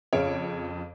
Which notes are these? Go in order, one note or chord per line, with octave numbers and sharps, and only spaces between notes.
F2 C#3 C#5 F5 D7